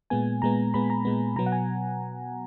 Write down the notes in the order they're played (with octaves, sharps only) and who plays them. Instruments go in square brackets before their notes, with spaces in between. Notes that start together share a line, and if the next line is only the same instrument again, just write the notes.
[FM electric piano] A#2 G#3 B3 G#5
A#2 G#3 B3 A#5
A#2 G#3 B3 B5
A#5
A#2 G#3 B3
B2 F#3 B3 A#5
F#5
G#5